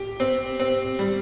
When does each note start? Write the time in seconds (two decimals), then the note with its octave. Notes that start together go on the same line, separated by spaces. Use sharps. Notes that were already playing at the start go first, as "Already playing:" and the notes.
Already playing: G4
0.20 C4
0.60 C4
0.99 G3